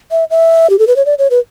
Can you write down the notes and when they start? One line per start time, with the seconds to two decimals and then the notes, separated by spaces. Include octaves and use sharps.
0.11 E5
0.31 E5
0.70 G4
0.79 A4
0.87 B4
0.96 C#5
1.06 D5
1.19 C#5
1.31 B4